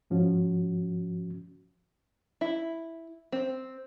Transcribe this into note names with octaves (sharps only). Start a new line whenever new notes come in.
G#2 F3 C#4 F#4
E4
C4